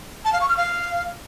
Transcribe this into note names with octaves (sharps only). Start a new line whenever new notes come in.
A5
F5
C#6
F6
F5